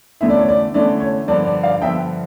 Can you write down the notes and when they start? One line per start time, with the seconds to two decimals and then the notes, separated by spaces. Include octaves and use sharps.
0.21 E2 D3 A3 C#4 E4 E5
0.29 D5
0.39 C#5
0.48 D5
0.74 E2 D3 A3 C#4 E4 D5
1.00 C#5
1.28 G2 D3 F3 D5
1.46 D5
1.63 D5 F5
1.81 G2 D3 F3 E5 G5